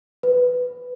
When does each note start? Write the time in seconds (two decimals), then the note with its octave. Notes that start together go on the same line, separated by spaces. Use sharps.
0.23 B4